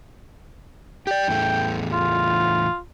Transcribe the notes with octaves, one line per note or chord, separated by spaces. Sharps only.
G4 D5 G5
E2 A2 A3
F4